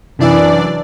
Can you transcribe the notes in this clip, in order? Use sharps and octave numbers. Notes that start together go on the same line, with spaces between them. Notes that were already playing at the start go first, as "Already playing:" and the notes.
F#2 C3 E3 D4 E4 D5 E6